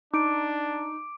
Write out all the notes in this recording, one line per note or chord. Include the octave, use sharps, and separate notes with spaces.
D4 D#4 D6 D7